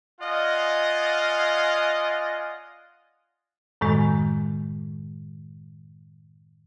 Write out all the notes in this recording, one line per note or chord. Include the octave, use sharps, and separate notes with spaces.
F4 D5 D#5 F5 F#5 G#5
F#2 A2 D#3 G#3